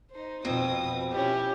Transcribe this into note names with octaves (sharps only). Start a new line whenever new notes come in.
D#4 C5
F2 B2 C4 D#6
C#4 E4 G4